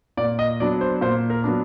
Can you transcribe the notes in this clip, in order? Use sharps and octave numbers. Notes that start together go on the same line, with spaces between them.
A#2 D5
D#5
F#3 B3 D4 D5
C5
A#2 C5
A#4
F#3 B3 D4